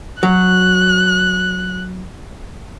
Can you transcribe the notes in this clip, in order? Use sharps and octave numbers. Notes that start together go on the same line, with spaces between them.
F#3 F#6